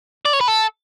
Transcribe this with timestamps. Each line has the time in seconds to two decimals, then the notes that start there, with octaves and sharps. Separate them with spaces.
0.25 D5
0.33 C#5
0.41 B4
0.48 A4